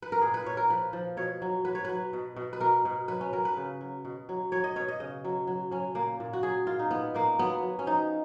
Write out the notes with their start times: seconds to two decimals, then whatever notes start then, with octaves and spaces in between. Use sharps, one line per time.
0.02 B4
0.12 A#4
0.21 A#2 G#4
0.34 B4
0.46 A#2 C#5
0.57 A#4
0.69 F3 B4
0.93 F3
1.17 B2 C#5
1.42 F#3
1.65 F#3 B4
1.75 C#5
1.85 F#3 B4
2.13 B2
2.36 B2
2.53 B4
2.60 B2 A#4
2.85 B2
3.08 F#3 B4
3.21 C#4
3.33 F#3 A#4
3.45 B4
3.57 C#3
3.81 F#3
4.05 B2
4.29 F#3
4.52 F#3 C#5
4.64 D#5
4.76 B2 C#5
4.88 D#5
5.00 C#3 D#5
5.24 F#3
5.47 F#3
5.71 F#3 C#4
5.95 A#2 A#3
6.20 A#2
6.33 F#4
6.43 F#3 G#4
6.67 A#2 F4
6.79 D#4
6.91 A#2 B3
7.15 A#2 A#3
7.39 F#3 B3
7.63 F#3
7.79 C#4
7.86 F3 D#4